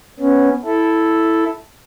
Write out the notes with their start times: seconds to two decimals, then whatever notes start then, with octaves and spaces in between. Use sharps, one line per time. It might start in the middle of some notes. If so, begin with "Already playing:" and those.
0.20 B3 C#4
0.65 E4 A4